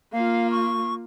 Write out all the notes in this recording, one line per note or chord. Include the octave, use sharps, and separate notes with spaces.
A#3 F4 F5
C#6